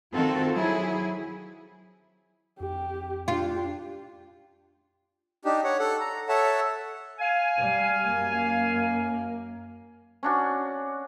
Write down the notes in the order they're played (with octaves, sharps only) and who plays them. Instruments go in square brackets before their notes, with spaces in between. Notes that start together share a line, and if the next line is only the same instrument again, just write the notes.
[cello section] D#3 C4 F4 F#4 A4
F#3 E4 G#4
[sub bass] F2 [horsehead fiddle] G4
[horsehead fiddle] D4 G4 [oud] F4
[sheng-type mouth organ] D4 D#4 G4
C#5 F#5
A4 F#5
A#5
A4 C#5 E5 F#5 A5
[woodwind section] F5 G#5
[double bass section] G3
F#2 A#3
[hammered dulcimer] C#4 D4 F#4